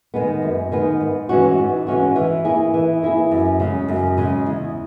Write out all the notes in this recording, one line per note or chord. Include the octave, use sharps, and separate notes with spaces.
D#3 G#3 B3
F#2
D#3 G#3 B3
G#2
E3 G#3 C#4 F#4
G#2
E3 G#3 C#4 F#4
E3
A#3 E4 G#4
E3
A#3 E4 G#4
F#2
C#3 G#3
F#2
C#3 G#3
E2